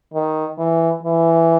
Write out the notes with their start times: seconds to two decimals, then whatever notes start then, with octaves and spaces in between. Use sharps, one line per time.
0.14 D#3
0.58 E3
1.03 E3